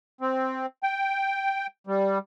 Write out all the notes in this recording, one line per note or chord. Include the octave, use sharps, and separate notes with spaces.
C4
G5
G3